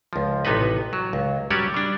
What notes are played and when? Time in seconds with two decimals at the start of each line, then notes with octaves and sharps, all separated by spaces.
0.13 C#2 F3
0.45 A1 C3 B3 D#4 B4
0.93 F#3
1.13 C#2
1.50 F#3 G3 C#4 G4 C#5 D5
1.74 G3 D4